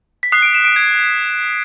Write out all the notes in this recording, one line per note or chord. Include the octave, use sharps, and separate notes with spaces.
B6
D#6 F#6 C7
D7
E7
D7
G#6